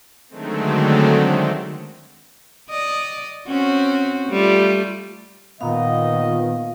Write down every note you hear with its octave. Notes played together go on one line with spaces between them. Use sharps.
D3 D#3 F#3 G#3 A3 C4
D5 D#5
C4 C#4 F#4
G3 A3 F4
A#2 D#3 B3 D#5 F5